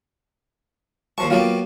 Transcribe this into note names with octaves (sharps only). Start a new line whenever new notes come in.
D#2 F3 A5 C#6
F#3 A#3 B3 F4 G4 A4